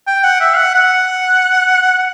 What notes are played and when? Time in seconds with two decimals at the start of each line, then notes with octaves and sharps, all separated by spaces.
0.07 G5
0.24 F#5
0.40 E5
0.57 F#5
0.74 F#5